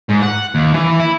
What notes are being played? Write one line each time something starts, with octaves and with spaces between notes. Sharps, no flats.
G#2
F#5
D#2
E3
E4